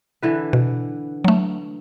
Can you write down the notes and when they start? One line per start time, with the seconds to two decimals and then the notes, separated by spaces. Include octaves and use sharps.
0.22 D3 E3 B4
0.53 B2
1.25 F#3 A3